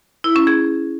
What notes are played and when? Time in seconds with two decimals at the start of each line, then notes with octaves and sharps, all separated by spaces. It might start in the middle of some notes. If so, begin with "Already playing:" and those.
0.24 E4
0.36 C#4
0.47 G#4